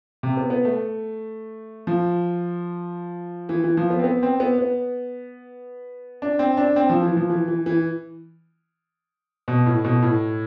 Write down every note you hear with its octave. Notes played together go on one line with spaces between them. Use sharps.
C3
B3
B3
A3
F3
E3
E3
F3
B3
C4
B3
C4
B3
B3
D4
C4
D4
C4
F3
E3
F3
E3
E3
E3
B2
A2
B2
A2